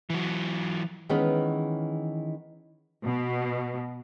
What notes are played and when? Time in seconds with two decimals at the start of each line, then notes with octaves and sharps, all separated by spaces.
0.10 E3 F#3
1.09 D#3 E3 G#3 B3 C#4
3.05 B2